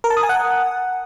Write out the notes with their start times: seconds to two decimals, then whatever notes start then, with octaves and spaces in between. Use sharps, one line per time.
0.04 A#4
0.10 A5
0.17 D#6
0.23 G#5
0.29 F#5